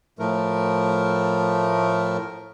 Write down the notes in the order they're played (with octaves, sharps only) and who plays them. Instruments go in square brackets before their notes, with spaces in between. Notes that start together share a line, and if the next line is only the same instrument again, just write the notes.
[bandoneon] A2 F3 A3 A#4